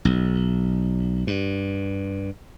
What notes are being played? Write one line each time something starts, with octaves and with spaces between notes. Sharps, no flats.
B1
G2